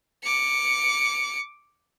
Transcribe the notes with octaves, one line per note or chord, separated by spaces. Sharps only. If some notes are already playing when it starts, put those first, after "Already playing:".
D6 C#7